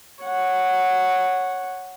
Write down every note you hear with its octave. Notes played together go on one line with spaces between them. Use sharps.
C#5 F#5